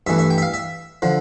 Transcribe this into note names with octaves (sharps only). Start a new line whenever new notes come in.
G2 E3 A3 E5
E5
G5
E5
F5
E5
D3 F3